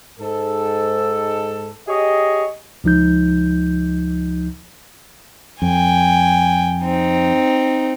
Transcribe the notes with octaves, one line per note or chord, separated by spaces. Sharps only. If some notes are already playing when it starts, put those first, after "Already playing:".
G#2 A4
G4 G#4 C#5 D#5
C#2 F3 D#4 G6
F2 G5 G#5
C4 D#4